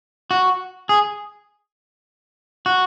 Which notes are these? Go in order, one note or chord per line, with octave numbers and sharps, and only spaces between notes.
F#4
G#4
F#4